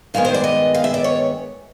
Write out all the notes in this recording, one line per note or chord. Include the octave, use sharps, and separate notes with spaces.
G2 D#3 G#3 B3 F5
C5
D5
D#5
F5
E5
D5
C#5